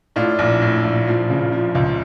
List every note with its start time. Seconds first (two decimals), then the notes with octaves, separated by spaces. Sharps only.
0.16 A2 D4 F4
0.39 A#1
0.61 A2
0.85 A#1
1.07 F3
1.30 C#3
1.52 F3
1.75 C#2